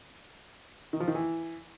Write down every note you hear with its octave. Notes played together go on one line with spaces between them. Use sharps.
D#3
F3
D#3
E3